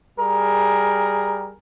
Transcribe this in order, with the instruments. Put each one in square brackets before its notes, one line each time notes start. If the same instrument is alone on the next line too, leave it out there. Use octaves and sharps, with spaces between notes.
[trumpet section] G3 G#4 A#4